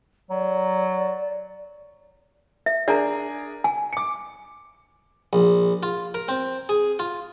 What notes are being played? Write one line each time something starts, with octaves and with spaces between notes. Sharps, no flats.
F#3 D5
E5
D4 G#4 A#4 D5 A#5
G#5
D6 C#7
A#1
F4
A#4
C4
G#4
F4